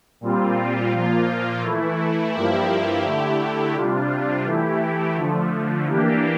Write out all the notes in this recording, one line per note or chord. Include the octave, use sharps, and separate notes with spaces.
A#2 G3 C4 F4
A#2 F3 A#3 F4
E3 A3 E4
G2 F3 A#3 E4 G4
D3 A3 E4 G4
C3 G3 D4 F4
E3 A3 E4 G4
D3 F3 A3
E3 A#3 D4 G4